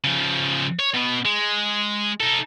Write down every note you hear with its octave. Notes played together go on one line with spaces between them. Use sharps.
C#3 F3
C#5
B2 B3
G#3
D#4 A4